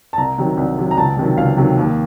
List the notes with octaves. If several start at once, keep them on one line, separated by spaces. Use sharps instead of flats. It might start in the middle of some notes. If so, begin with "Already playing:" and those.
A5
C2 A#5
C3 D#3 F#3
C2
C3 D#3 F#3
A#5
C#2 A5
C3 D#3 F#3
C#2 F5
C3 D#3 F#3
D#2